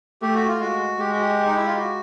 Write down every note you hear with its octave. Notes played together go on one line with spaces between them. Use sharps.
A3 G4
F#4
F4
G#3 F#4
G#3 G4
F#4
G4
D#4
E4
F4
F#4